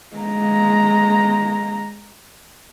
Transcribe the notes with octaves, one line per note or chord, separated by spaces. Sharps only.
G#3 A#5